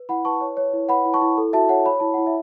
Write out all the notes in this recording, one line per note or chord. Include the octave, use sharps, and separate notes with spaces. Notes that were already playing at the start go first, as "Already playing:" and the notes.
Already playing: B4
E4 F#5 B5
B4 A5 C#6
C#5
C#5
E4
B4 F#5 B5
E4
A5 C#6
E4
A4
F#4 E5 A5
C#5 F#5
C#5 B5
E4 A5
E4 F#5
E5